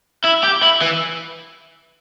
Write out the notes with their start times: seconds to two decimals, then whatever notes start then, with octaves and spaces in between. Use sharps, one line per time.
0.24 E4
0.43 G4
0.63 E4
0.82 E3